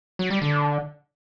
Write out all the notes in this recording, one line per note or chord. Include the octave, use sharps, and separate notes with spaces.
F#3
G3
D3